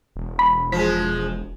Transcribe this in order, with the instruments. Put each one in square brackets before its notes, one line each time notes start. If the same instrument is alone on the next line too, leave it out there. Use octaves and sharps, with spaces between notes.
[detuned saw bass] E1
[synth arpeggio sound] B5
[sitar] F3 G#3 [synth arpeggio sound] B6